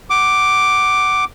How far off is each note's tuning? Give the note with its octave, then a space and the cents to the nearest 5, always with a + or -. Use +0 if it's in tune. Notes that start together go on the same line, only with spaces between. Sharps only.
F#5 +20 D6 +5